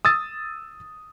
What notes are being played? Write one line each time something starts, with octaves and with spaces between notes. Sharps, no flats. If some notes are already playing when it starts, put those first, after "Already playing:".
D#6 E6 A6